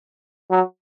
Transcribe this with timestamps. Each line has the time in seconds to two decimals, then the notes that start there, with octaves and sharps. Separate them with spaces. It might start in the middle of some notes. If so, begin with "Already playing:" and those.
0.51 F#3